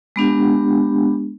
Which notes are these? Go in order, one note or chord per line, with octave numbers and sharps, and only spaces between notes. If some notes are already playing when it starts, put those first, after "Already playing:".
G#3 B3 D4 G4